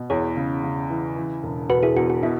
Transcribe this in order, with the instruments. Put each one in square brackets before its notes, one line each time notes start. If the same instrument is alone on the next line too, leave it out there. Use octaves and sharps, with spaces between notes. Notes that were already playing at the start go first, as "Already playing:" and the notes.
Already playing: [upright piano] B2
[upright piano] E2 [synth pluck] G#4 C#5
[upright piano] C#3
C#3
E3
E3
E1
[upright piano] E1 [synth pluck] F#4 B4
[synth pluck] E4 G#4
[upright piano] E2 [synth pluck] F#4
[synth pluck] F#4
[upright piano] B2 [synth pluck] E4